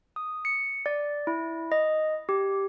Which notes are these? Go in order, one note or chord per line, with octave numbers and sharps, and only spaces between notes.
D#6
C#7
D5
E4
D#5
G4